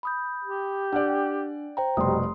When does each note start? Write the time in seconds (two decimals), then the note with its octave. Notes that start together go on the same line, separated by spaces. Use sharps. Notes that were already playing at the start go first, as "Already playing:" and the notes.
0.03 B5 D#6 G6
0.44 G4
0.93 D4 D5 F#5 G5
1.77 C5 G5 A#5
1.97 F1 B2 G3 C6 D#6